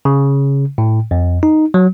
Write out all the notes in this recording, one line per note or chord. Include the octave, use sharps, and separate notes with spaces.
C#3
A2
F2
D#4
F#3